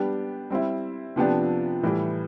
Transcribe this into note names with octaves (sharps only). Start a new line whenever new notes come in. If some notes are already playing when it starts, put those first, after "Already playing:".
Already playing: G3 B3 D4 G4
G3 C4 E4
C3 F3 B3 D4 G4
A2 E3 G3